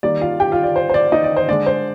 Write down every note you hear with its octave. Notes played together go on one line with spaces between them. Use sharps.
D#3 G3 A#3 D5
F4 F5
G4 G5
F4 F5
D5
C5
C5
D5
D#4 D#5
D5
C5
D3 G#3 D5
C5